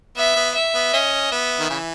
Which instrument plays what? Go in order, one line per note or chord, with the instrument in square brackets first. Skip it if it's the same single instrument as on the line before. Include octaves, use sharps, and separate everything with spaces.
[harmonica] B3 [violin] E5
[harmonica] B3
[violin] E5
[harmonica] B3
[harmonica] C#4 [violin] D#5
[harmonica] B3 [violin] E5
[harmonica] D#3
C#3 E3